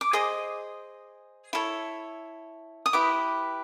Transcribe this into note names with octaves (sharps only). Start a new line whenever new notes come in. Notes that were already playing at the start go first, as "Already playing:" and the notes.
D6
G#4 C5 D#5 D#6
E4 A4 C#5
D#6
E4 G4 B4 D6